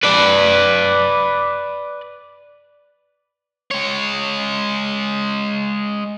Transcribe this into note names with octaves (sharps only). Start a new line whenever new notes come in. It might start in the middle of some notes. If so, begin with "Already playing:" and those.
B4 D5
G#3 C#5